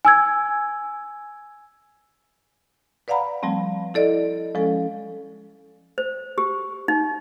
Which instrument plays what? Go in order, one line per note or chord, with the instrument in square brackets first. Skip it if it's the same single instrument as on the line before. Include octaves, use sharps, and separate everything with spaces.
[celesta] G#5 E6 G#6
[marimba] B4 D5 F5 F#5 A#5 B5
F3 G3 A3 C4
E4 A4 D5 D#5
F3 G#3 C#4 A4
[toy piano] C5
G4
D#4